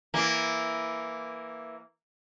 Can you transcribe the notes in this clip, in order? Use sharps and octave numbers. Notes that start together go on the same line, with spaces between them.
E3 A#3